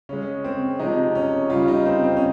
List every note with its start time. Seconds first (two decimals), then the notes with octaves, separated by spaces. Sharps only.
0.09 C#3 G#3 C#4
0.44 C4
0.79 C3 F3 G#3 D#4
1.15 C#4
1.50 C#3 G3 F4
1.68 D#4
1.86 C4
2.04 C4
2.17 C#4